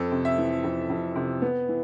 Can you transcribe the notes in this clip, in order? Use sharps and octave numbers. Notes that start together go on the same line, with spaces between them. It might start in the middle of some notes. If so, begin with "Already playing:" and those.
Already playing: F2 A4
C3
E5
E3
F2
F2
C3
B3
E3